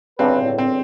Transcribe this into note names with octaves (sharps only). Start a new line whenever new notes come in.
G1 C#3 C4 D4 B4
A2
C4